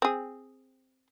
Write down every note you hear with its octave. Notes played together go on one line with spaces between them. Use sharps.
C4 G#4